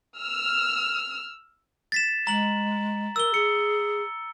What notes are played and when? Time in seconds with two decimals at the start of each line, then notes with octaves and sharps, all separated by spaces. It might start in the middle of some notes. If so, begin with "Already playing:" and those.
0.17 E6 F6
1.92 A6 B6 E7
2.27 G#3 A#5 F#7
3.16 A#4 E6 G7
3.34 G#4 C#7